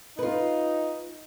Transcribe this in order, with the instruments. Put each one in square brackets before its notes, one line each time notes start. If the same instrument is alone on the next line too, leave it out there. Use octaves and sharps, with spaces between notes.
[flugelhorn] D#4 [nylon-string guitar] F4 B4